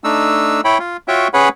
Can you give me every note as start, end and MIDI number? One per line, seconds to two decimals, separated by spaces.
0.04 0.61 57
0.04 0.61 62
0.04 0.61 63
0.04 0.61 88
0.65 0.78 64
0.65 0.78 73
0.65 0.78 79
0.65 0.78 83
0.80 0.97 65
1.08 1.28 65
1.08 1.28 66
1.08 1.28 73
1.08 1.28 76
1.08 1.28 79
1.34 1.49 61
1.34 1.49 68
1.34 1.49 71
1.34 1.49 73
1.34 1.49 78
1.34 1.49 83